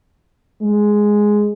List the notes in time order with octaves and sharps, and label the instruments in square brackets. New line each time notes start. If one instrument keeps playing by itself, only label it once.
[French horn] G#3